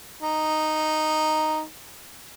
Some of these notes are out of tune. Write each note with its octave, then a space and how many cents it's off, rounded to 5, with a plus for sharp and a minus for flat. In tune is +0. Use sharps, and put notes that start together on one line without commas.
D#4 -5